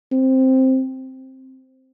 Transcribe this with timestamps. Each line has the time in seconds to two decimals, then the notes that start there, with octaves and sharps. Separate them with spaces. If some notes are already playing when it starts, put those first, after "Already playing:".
0.12 C4